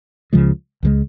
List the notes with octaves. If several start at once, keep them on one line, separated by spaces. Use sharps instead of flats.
C#2 C#3 F3 G#3
C#2 C#3 F3 G#3